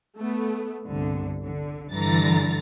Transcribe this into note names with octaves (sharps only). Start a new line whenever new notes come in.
A3 B3
G1 C2 D3
D3
G2 D3 E3 A#5 A6 A#6